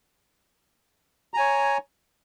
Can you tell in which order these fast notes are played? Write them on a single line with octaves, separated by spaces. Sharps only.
A#5 G#5 C#5